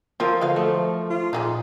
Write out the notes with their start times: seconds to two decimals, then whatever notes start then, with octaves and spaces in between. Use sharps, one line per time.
0.20 F3 C4 A#4 D#5
0.41 D3 F#3 B4 F5
0.56 F3 A3
1.10 F4
1.33 A#2 D#4 F#4 G#4